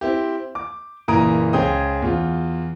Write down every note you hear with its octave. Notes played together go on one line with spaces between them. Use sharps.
C4 E4 G4
D6
F#1 A#2 E3 A#5 D#6 D7
C#2 C#4 G#4 C5 G5 D#6
E2 F4